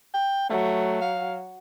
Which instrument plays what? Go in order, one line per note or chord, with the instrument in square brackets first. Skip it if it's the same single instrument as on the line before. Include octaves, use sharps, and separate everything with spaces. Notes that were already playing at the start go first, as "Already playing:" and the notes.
[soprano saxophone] G5
[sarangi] F#3 [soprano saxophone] A3
[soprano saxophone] F5